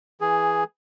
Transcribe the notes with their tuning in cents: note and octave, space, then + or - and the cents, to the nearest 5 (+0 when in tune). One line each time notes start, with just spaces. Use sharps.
E3 +0 G#4 +0